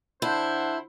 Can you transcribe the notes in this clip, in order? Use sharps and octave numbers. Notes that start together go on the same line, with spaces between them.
D3 D4 E4 C5